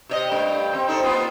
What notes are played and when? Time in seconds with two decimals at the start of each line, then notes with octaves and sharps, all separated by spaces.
0.09 C3 C#5 D#5
0.31 G2 A3
0.74 C4
0.87 C4 D#4 A4
1.02 A#3 B3 F4